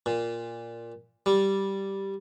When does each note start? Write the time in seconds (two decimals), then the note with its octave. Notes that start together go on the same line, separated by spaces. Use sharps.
0.06 A#2
1.26 G3